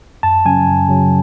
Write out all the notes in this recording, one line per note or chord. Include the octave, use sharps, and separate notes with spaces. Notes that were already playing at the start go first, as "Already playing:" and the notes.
F#2 A5
C#3 F#3 C#4 G#5
F#2
C#3 F#3 C#4